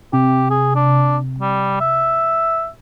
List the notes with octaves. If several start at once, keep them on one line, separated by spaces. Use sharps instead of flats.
C3 G4
G#4
D4
G3
E5